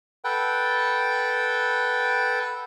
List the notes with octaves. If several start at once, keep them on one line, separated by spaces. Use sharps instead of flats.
A4 B4 F#5 G5